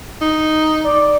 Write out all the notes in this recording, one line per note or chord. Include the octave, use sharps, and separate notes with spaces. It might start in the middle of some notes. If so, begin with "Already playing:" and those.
D#4
D5